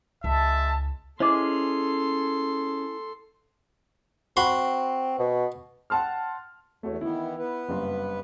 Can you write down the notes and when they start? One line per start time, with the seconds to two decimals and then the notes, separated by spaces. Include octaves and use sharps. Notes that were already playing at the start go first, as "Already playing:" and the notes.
0.24 C#2 G#3 E5 A5
1.20 C#4 E4 G#4 A4 C5 D#5 C6 D6
4.37 C4 F#4 B5 C6
5.19 B2
5.90 F#5 G5 A5 C6 F6
6.83 E2 A3 F#4 C#5
7.01 D#3 E3 B3 E4
7.39 B3 B4
7.69 F#1 G2 C6